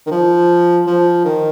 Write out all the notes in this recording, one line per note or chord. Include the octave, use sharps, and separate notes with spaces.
D#3
F3
F3
D#3